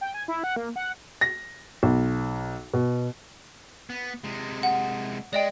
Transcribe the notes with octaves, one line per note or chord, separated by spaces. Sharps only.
G5
G#5
E4
F#5
A#3
F#5
A#6
B1
B2
B3
C3 G#3
F#5
G#3 D5 D#5 G5